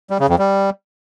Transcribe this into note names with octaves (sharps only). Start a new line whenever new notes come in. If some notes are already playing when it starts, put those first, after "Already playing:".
G3
C#3
F2
G3